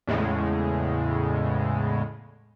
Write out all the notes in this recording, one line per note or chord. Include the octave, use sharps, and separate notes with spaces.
E2 A2 C#3 G#3